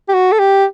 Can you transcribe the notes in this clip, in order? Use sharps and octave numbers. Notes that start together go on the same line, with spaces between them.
G4
F#4
A4
G4